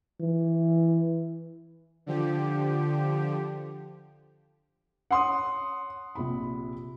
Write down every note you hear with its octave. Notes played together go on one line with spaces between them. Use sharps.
E3
D3 F3 G4
C#5 F#5 C6 D#6
A#1 C3 B5